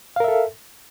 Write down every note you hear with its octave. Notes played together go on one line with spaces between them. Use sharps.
A4 A#4 E5 F5